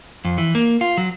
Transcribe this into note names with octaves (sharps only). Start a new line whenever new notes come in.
F2
E3
A#3
F4
F#3